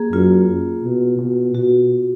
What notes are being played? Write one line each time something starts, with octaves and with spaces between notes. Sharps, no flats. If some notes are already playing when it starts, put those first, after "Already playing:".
Already playing: A#3 G#4
F#2 F4
B2
B2
B2 F#4